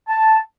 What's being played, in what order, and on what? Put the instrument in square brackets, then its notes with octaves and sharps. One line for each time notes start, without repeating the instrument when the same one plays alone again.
[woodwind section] A5